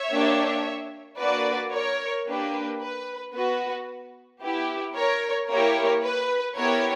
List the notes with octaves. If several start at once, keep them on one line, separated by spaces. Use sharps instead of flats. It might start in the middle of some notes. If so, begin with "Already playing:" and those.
Already playing: C#5 E5
A#3 D4 G4
A#3 D4 F#4 B4 D5
A#4 C#5
A#3 D4 G4 B4
B4
B3 F#4 B4
B3 E4 G4
A#4 C#5
A#3 E4 G4 A#4 C#5
B4
B3 E4 G4 A#4 C#5